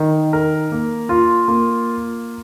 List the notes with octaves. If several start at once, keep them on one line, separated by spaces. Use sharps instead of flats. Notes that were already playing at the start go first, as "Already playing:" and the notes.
Already playing: D#3
A#4
A#3
F4
A#3